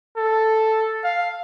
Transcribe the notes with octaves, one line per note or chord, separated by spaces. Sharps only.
A4
F5